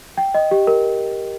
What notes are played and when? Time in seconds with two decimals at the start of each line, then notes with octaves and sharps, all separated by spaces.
0.18 G5
0.34 D#5
0.51 G4
0.67 A#4